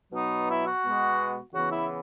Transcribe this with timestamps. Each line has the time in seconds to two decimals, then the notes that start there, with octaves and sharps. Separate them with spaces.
0.13 B2 F#3 B3 D#4
0.48 E4
0.66 F#4
0.84 B2 G#3 B3
1.53 C#3 E3 B3 F#4
1.71 E4